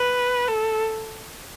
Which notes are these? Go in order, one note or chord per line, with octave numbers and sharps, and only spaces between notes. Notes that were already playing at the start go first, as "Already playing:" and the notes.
Already playing: B4
A4